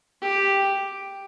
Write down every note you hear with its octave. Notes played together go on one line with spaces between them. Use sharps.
G4